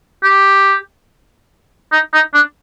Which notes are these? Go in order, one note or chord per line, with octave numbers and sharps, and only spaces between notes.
G4
D#4
D#4
D4